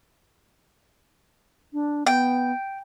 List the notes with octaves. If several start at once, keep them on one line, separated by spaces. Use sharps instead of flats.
D4
B3 G5